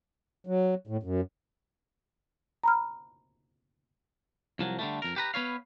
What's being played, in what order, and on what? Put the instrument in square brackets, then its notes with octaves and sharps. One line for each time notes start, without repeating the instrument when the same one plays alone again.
[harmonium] F#3
A2
F#2
[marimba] A#5 B5 F6
[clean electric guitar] C2 F3 F#3
D3 G3 A3
F2 A#4
G4 B4 A#5
B3 B4 C#5 F5